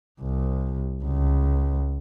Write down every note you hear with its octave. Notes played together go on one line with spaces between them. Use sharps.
C2
C#2